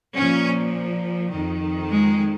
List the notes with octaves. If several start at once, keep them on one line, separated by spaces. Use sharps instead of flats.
A#2 F3 C#4
F2 D#3
G#3